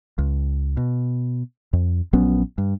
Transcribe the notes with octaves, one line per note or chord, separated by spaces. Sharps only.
C#2
B2
F2
A#1 F#3 B3 C#4
G2